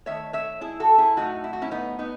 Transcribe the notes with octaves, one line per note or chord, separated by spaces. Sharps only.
D#3 A3 C#5 E5
C#5 E5
E4 G#4
F#4 A4
E4 G#4
A2 F#3 A3 D#4 F#4
E4
F#4
C#4 E4
B3 D#4
B3 D#4